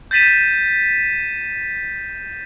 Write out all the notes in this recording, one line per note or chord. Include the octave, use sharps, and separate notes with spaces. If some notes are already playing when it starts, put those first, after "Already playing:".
G6 A6 B6 D#7 E7